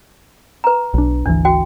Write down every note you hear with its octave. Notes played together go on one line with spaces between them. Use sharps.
B4 A#5
B1 D4
G#1 D2 E3 D4
F#4 G5